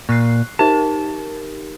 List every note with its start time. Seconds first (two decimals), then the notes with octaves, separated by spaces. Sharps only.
0.09 A#2 C#6 F#6 C7
0.59 D#4 G4 A#4 A5